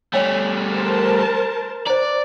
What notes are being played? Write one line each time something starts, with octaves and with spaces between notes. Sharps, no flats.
G3 A3 C#5 G5 G#5
A#4 C5 A5
C5 D5 A#5